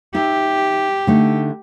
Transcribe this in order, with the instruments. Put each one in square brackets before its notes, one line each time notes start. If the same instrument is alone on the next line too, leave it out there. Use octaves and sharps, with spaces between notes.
[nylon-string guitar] D#4 E5 [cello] G4
[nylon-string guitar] D3 A3 D#4